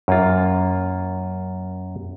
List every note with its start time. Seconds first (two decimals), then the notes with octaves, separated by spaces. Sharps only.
0.08 F#2 A#3 F4